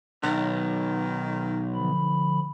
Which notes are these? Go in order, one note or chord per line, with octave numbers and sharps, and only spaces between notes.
B1 D#3
D3 F3 B5